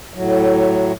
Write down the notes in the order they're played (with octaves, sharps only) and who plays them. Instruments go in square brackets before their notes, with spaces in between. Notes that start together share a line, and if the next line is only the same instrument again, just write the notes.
[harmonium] A2 F#3